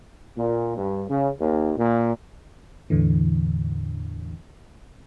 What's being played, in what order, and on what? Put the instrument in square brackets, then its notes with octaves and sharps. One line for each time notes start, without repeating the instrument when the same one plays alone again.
[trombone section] A#2
G2
C#3
D#2
A#2
[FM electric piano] E2 A2 D3 E3